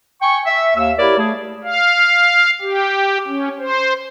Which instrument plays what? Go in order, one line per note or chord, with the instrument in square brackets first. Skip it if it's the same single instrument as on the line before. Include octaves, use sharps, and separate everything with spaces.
[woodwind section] G5 G#5 C#6
E5
D#2 F5 E6
E4 G4 A#4 C#5 D5
A3 G#4
[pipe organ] F5
G4
C#4
C5